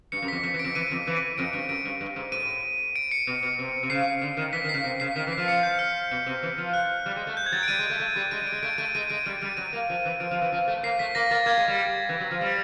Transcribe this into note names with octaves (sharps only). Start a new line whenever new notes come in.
G2 C#7
F#2
B6
F2
F2 B6
E3
D7
F2
E3 D#7
F2
E3
F2 D7
G2 D7
F#2 D7
G2
G2
G#2
A2 D#7
D7
C#7
B2
B2
C3
C3
C#3 C7
D3
D#3
E3 B6
D#3
C7
C#3
C3
C#3 C7
D#3 B6
E3
C7
F3
C#7
G6
F6
B2
C3
E3
F3
F#6
G3
G#3
A3
G6
G#6
F#3 A6
D7
G3 D#7
G#3
A3
A3
G3
G#3 D#7
G3
D7
G#3
A3 D7
A3 D#7
G#3 D#7
G#3 D7
G3 D#7
G3 D7
F#3 D#7
A#3
F3
E3
F3 D7
F3
E3
F3
A3
A#3 C7
A3 B6
A#3 A#6
A#3 A6
A#3 G#6
G#3
G3
E3
F#3
F3
G3